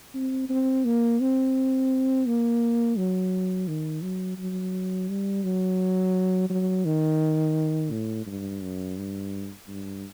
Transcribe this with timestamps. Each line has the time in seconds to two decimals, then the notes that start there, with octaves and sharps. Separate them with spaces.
0.14 C4
0.49 C4
0.85 A#3
1.20 C4
2.26 A#3
2.97 F#3
3.68 D#3
4.03 F#3
4.38 F#3
5.09 G3
5.44 F#3
6.50 F#3
6.85 D#3
7.91 A2
8.26 G2
8.62 F#2
8.97 G2
9.68 G2